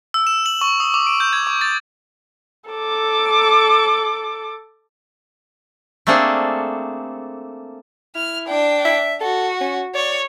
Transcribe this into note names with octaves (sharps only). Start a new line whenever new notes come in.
E6
E7
F#7
C#6
D#6
D6
D7
G6
G#6
C#6
A6
A4 D6
A3 A#3 C4 D4 G#4 A4
E4 F6
D4 G5
E5
F#4 A4
C#4
C#5 D5